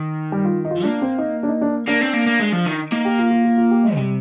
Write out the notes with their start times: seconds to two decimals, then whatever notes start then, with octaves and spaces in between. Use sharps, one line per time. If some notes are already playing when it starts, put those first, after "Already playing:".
Already playing: D#3
0.32 G3
0.45 F4
0.65 D#4
0.71 F4
0.84 A#3 D4
1.02 C4
1.18 D#4
1.43 D4
1.49 D#4
1.61 D4
1.88 A#3 D4
2.01 C4
2.14 A#3
2.27 A#3
2.40 G#3
2.53 F3
2.66 D#3
2.92 A#3 D#4
3.05 G4
3.19 F4
3.31 F4
3.45 F4
3.57 F4
3.71 G4
3.84 G#3
3.96 C3 G3